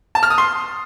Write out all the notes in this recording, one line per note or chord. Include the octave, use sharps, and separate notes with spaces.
A5
F6
D#6
C6